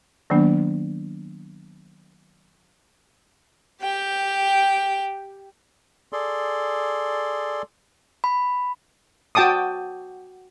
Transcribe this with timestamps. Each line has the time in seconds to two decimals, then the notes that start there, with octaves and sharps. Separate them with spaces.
0.30 D#3 F#3 A#3 B3 D4
3.82 G4 G5
6.13 G#4 A4 D5 C6
8.24 B5
9.35 F#4 G5 A5 D6 D#6